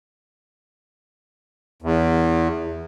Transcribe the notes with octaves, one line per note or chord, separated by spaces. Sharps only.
E2